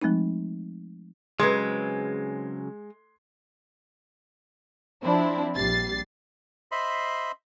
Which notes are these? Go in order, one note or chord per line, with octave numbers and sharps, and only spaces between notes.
F3 G#3 A3 C4 D#4
C#3 F#3 G#3 C4 B4 C6 G#6
F3 C4 D4 E4
A#1 G3 A6 C7
C5 D#5 E5 B5 C6